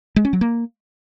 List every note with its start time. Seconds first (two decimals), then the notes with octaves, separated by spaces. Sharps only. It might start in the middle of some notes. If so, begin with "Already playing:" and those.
0.16 G#3
0.25 C#4
0.33 F#3
0.41 A#3